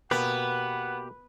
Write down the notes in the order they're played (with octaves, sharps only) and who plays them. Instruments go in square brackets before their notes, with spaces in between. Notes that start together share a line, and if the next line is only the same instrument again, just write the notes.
[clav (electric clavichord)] B2 A#3 [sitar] B3 [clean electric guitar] G4 B4 [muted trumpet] F#5